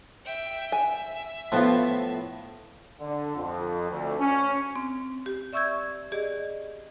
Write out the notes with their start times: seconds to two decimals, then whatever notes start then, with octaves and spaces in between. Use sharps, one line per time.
0.25 E5 G5
0.72 E5 G#5
1.52 A2 F3 B3 F4
3.00 D3
3.36 F2
3.90 D2
4.19 C#4
4.76 C4
5.26 G4
5.53 D5 E5 C#6 E6 G6 G#6
6.12 G4 G#4 D5 D#5